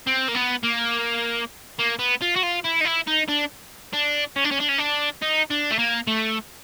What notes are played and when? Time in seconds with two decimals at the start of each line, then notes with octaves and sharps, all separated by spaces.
0.07 C4
0.29 A#3
0.35 B3
0.64 A#3
1.79 A#3
1.99 B3
2.22 F4
2.36 F#4
2.43 F4
2.64 E4
2.81 D#4
2.85 E4
3.07 D#4
3.28 D4
3.93 D4
4.36 C#4
4.44 D4
4.51 C#4
4.60 D4
4.69 C#4
4.79 D4
5.22 D#4
5.51 D4
5.71 A3
5.79 A#3
6.07 A3